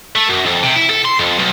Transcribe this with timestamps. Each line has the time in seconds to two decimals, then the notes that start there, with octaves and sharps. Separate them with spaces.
0.15 A3
0.28 F#2
0.45 F2
0.63 C3
0.76 E4
0.90 A4
1.05 C6
1.19 F2
1.39 B1